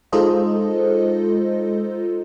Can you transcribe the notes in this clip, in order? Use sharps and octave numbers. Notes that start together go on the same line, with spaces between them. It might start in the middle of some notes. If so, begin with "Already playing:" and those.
G#3 D#4 F4 A4 C5 D#5